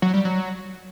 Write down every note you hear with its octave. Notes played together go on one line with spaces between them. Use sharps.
F#3
G3
F#3